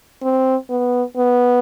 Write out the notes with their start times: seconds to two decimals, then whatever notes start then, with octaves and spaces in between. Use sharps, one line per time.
0.23 C4
0.70 B3
1.17 B3